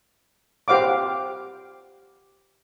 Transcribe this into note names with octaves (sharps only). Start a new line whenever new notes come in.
G4 C5 F5 F#5 D6